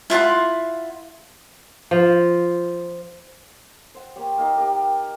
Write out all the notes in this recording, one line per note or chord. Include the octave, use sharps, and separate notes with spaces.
E4 F4 F#5 C6
F3
C5 F#5
A#3 G4 C#5
A#3 D#4 A#4 F5
G4 A#4 G5 A#5